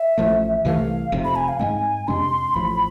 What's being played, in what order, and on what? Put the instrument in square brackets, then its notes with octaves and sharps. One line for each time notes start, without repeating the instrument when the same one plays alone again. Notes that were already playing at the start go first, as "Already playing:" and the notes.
Already playing: [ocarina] E5
[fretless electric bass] A1 A2 F3 A3
[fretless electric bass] C2 C3 E3 A3 [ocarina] F5
[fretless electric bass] F1 F2 C3
[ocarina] B5
G#5
F5
[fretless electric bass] G#2 G#3 C4 [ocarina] G#5
[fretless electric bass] F2 C3 G#3 D4 [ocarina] C6
[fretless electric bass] A1 A2 F3 [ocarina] B5